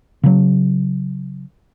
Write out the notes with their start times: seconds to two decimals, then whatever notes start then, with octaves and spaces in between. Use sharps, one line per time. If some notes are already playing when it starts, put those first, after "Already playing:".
0.23 C#3 F#3